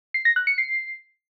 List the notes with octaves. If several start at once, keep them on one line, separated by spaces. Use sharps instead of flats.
C7
A#6
F#6
C#7
C7